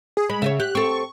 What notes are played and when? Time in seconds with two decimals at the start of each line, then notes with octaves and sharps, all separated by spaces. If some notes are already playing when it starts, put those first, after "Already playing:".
0.17 G#4
0.29 G#3 B5
0.42 C#3 C#5 D#5 E5
0.60 G4 F#6
0.75 C4 A4 C#6